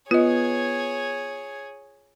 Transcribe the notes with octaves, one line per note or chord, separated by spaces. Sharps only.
B3 F4 G#4 C#5 D#5